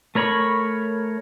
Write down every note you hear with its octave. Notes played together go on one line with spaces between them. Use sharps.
A3 A#4 C#5 B5 C#6